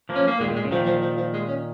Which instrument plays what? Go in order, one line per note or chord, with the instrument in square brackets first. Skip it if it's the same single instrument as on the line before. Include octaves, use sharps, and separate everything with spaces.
[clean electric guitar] F3 A#3
[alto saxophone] C#4
A#3
[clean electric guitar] A#2 D#3 [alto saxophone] G#3
[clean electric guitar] A#2
[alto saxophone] G#3
[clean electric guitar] C#3
[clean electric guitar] A#2 D#3 [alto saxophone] F3
[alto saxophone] F3
F3
F3
G#3
C#4